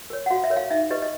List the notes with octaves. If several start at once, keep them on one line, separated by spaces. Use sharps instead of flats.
A#4 C#5
F#5
F#4 F5
E5
A#4 C#5
F5
D#4 E5
G4 B4 D#5
D#5